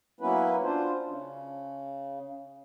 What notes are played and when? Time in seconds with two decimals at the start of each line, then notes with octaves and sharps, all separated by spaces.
0.21 F#3 A#3 B3 C#4 E4 B4
0.63 D4 F4 C5
1.05 C#3